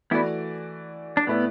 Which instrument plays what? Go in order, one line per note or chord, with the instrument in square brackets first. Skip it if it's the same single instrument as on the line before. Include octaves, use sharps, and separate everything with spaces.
[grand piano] E3 A3 F#4 D5 [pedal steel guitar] B3 E4
[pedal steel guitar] D4
[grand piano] A2 A3 E4 B4 D5 [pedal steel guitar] B3